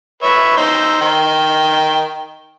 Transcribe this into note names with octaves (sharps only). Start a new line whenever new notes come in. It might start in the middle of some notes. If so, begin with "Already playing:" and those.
B4 C#5 E5
D#4 C5 E6
D#3 G5